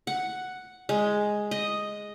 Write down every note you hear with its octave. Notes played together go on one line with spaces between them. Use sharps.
F#5
G#3
D#5